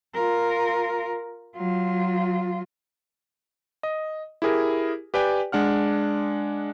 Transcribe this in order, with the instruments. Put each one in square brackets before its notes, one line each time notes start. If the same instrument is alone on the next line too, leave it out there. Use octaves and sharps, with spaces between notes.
[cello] F4 A#4
F#3 F4
[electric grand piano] D#5
E4 G4 G#4 A#4
G4 B4 D5 G5 G#5
G#3 D4 F#5 F6